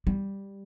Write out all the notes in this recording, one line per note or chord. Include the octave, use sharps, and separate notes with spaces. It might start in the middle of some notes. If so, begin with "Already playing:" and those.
G3